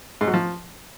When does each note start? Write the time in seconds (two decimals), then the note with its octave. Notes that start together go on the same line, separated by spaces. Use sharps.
0.21 G#2
0.27 F#3
0.34 F3